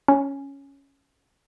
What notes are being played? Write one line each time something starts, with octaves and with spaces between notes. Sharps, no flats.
C#4